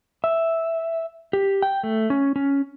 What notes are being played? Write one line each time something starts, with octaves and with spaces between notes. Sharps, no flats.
E5
G4
G5
A3
C#4
C#4